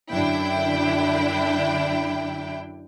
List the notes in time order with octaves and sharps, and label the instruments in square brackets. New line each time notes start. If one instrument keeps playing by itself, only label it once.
[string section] F#2 D3 D4 E4 G5